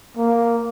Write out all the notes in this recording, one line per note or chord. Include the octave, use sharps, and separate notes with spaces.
A#3